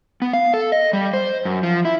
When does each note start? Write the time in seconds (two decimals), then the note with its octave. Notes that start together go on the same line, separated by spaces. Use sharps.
0.22 B3
0.33 F5
0.54 A4
0.72 D#5
0.93 G3
1.14 C5
1.45 F#2
1.63 F3
1.85 E4